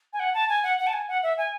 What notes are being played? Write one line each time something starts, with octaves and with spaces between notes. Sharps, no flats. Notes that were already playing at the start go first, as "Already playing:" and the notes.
G#5
F#5
A5
G#5
F#5
F#5
A5
G#5
F#5
E5
G#5